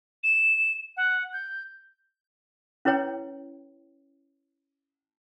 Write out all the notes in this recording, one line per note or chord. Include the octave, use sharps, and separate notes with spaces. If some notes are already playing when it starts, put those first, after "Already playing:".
E7
F#5
G6
C#4 E4 B4 C#5 G5